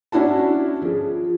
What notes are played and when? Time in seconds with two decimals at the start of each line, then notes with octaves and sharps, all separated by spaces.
0.12 C#4 D4 E4 F#4 A5
0.82 F3 G#4